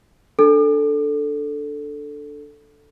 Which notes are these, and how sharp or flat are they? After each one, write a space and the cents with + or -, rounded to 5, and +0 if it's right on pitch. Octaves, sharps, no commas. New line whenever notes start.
D4 +0 A4 +0